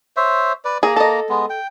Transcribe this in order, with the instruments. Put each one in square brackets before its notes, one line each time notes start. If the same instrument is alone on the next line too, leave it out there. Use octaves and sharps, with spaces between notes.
[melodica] C5 C#5 E5
B4 D5
[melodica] A#3 A#5 [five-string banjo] G#4
[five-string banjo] A4 D#5
[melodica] G#3 B3
G5